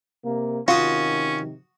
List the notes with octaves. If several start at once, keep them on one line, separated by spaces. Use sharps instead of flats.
C3 A#3
C3 D#3 C#4 F4 F#4 D#6